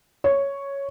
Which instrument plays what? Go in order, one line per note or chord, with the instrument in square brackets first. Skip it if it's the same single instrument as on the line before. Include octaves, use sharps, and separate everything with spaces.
[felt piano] C#5